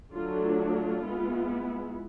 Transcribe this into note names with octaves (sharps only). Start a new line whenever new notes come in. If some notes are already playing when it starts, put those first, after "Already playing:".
D3 F#3 A3 D4 F4
F4
G#3 B3 E4